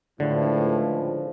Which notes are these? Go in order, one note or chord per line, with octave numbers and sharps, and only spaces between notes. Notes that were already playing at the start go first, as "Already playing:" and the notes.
C#2 A2 D3 F3